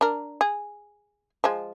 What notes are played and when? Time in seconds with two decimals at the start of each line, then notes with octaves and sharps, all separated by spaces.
0.01 D4 A#4
0.41 G#4
1.44 F3 G#3